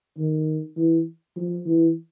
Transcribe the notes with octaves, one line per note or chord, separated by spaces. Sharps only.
D#3
E3
F3
E3